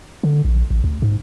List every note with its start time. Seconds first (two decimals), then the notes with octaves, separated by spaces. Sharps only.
0.23 D3
0.45 A#1
0.71 A1
0.84 D2
1.02 G#2